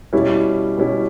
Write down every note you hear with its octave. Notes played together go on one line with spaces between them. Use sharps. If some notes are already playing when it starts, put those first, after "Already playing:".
B2 G3 C#4 E4
B2 G3 C#4 E4